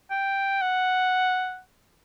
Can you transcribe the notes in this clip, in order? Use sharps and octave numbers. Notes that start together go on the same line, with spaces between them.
G5
F#5